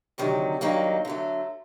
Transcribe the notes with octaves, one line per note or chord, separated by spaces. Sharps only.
D2 C3 D#3 F#3
G2 D#3 F#3 A#3 D#4
D3 F#3 A3